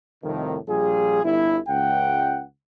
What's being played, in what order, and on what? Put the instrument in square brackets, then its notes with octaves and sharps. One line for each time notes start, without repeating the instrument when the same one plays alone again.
[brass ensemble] C2 F2 A2 D#3
A#1 G3 F4 G#4
G1 E4
C#2 F#5 G5